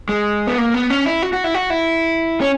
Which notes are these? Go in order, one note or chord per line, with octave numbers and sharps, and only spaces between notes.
G#3
B3
A#3
B3
C#4
E4
F#4
F#4
E4
F#4
E4
C#4